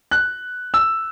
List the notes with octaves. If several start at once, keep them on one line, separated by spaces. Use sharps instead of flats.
F#6
E6